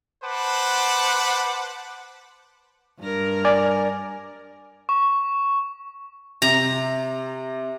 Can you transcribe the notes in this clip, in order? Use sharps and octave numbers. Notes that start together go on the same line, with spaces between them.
B4 C5 F#5 A5 D6
G2 A#4
D5 G#5
C#6
C3 A#5